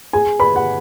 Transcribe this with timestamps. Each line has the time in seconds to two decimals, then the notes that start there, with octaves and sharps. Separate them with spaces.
0.13 G#4 G#5
0.40 B4 B5
0.56 F#5